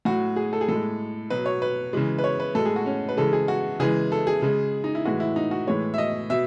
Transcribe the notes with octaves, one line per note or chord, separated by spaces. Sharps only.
A2 F#3 F#4
G#4
A4
G#4
A2 G#3 A4
B2 F#3 B4
C#5
B4
C#3 E3 G#3
B4
C#5
B4
A2 G#3 A4
G#4
F#4
C#4
B4
C#3 E3 G#3 A4
G#4
F#4
C#3 E3 G#3 G#4
A4
G#4
C#3 G#3
D#4
E4
A2 E3 G#3 F#4
E4
D#4
F#4
A2 E3 G#3 C#5
E5
D#5
B2 E5